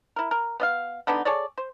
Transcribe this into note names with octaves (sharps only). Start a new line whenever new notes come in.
E4 A#4
A#4
B3 D#5 F5
D3 B3 D4 D#4
G#4 A4 C#5 D5
C5